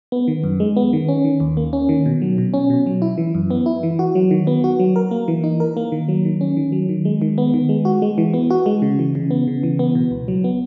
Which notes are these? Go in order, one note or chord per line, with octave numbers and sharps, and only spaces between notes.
B3
D#3
F#2
G#3
B3
D#3
C#4
D#3
D#2
A#3
C#4
D#3
B2
F#3
B2
C#4
B2
F#3
E4
E3
F#2
B3
E4
E3
F#4
F#3
D#3
B3
F#4
F#3
A#4
A#3
E3
D#4
A#4
A#3
D#3
F#3
D#3
C#4
D#3
F#3
D#3
G#3
D#3
B3
D#3
G#3
F#4
G#3
E3
B3
F#4
G#3
C#3
E3
C#3
B3
C#3
E3
B3
B2
C#2
F#3
B3